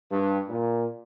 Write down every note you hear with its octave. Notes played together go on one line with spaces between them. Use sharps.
G2
A#2